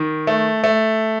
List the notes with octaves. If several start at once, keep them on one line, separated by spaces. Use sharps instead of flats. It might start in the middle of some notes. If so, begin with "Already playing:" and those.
Already playing: D#3
A3
A3